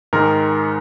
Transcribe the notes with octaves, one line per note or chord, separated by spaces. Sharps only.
G#2 D#3 G#3 D#4 A#4